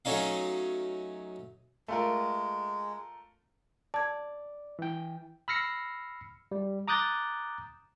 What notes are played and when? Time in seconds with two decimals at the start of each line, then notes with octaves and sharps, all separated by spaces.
0.05 F#3 A3 C#4 D#4 F5
1.88 G#3 A3 F4 A#4
3.94 D5 A5 G#6
4.79 E3 G5
5.48 B5 E6 F6 A#6 C7 C#7
6.51 G3
6.88 A#5 D6 D#6 F#6 G6 A6